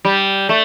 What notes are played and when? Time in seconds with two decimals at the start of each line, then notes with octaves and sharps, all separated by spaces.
0.05 G3
0.49 A3